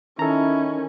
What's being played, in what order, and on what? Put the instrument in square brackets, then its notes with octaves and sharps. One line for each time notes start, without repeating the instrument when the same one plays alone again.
[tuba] D#3 [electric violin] C#4 [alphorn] E4 [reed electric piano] A4 A#5